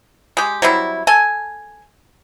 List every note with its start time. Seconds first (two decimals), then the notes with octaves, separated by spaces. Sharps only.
0.37 G#3 G4
0.62 F#3 G3 C4 E4
1.07 A4 G#5